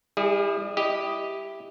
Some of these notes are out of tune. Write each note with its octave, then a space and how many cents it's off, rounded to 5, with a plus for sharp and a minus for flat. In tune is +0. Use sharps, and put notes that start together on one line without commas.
G3 +35 E4 +0 G#4 -10
E4 +0 G4 +0 D#5 +0